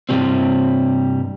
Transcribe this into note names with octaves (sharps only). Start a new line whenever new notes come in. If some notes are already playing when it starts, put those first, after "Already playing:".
G2 C3 E3 F3 G3 C4